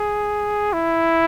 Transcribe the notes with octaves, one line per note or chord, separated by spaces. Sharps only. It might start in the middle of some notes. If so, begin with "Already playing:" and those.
Already playing: G#4
E4